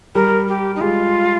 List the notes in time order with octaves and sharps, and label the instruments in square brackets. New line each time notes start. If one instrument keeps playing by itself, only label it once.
[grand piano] G3 [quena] A#4
[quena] G4
D#4
[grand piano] G#3 [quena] F4